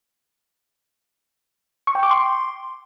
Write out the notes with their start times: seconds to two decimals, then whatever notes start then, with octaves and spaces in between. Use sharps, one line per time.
1.87 C#6
1.95 G5
2.03 D6
2.11 C6